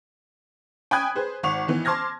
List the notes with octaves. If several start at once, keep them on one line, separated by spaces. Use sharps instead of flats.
G5 G#5 B5 D#6 F#6 G#6
G#4 B4 C5
G#1 F#5 C#6 D6 F7
D#3 E3 B3
A5 C6 D6 F6 G#6 A#6